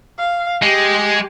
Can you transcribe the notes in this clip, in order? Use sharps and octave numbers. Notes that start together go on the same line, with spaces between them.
F5
G#3 G4